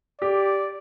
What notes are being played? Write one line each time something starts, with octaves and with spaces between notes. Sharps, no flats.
G4 D5